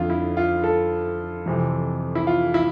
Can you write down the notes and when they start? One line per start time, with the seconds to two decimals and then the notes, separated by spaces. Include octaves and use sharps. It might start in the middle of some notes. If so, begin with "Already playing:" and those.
Already playing: F2 D3 F4
0.10 E4
0.37 F4
0.64 A4
1.46 F2 C3 E3
2.15 E4
2.27 F4
2.54 E4